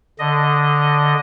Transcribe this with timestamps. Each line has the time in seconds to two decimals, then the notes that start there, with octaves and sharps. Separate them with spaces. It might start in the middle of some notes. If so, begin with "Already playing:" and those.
0.19 D3 D#5